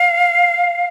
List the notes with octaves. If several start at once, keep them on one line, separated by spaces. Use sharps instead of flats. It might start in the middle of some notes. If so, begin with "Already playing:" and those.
Already playing: F5